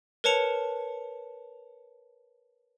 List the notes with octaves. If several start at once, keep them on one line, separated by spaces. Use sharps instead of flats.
A#4 B4 C#5 A5 C#7 F7